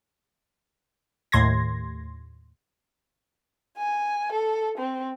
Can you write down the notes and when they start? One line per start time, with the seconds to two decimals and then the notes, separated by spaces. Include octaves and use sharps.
1.32 D#2 A2 C6 G#6 A#6
3.77 G#5
4.32 A4
4.78 C4